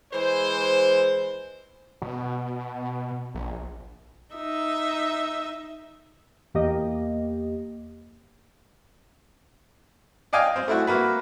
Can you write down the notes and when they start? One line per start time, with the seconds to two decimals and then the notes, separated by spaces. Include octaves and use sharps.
0.13 E3 G#3 C5
2.02 B2
3.35 A#1
4.35 D#4 E5
6.54 E2 A#3 G4 D#5
10.33 D5 D#5 F5 G5 G#5
10.56 C4
10.68 A3 E4 F#4
10.87 A#3 F#4 B4